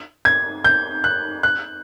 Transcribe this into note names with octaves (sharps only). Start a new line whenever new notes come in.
G#6
G6
F#6
F#6